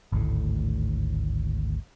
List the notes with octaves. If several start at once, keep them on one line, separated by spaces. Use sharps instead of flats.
G#1 D2 A2